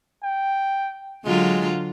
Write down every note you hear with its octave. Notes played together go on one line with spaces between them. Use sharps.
G5
D3 F#3 G#3 F4